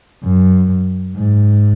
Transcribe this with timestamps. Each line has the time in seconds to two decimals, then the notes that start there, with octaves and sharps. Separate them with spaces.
0.23 F#2
1.15 G#2